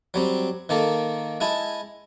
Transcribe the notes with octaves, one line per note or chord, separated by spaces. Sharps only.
F#3 G3 C4
D#3 A#3 A4
G#3 E4 A5